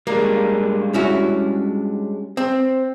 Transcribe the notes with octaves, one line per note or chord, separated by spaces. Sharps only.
G3 G#3 A#3 D4
C#4 E4 F#4
C4